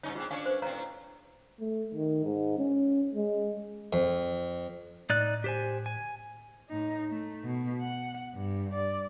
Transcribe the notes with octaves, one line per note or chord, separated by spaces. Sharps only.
G2 C#4 D#4 C#5
G#2 C4 F4
C#4 D4 C#5 F5
B4 C5
A2 C4 C#5 F5 A#5
A3
D#3
G#2
C#4
G#3
F2
A2 D#4 D5 F#6
G4 C5 G#5
G#5
A2 D#4
A3
B2
F#5
G2
D5